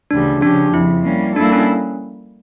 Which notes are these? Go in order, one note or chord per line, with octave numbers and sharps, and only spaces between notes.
D2 C#3 E3 G3 D4
C#3 F3 C#4 D4 G4
F2 C#3 F3 E4
G3 A#3 C#4
G3 A#3 D4 E4 A4
C#4